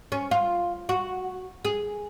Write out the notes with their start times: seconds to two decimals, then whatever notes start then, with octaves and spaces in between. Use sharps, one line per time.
0.12 C#4
0.31 F4
0.89 F#4
1.65 G#4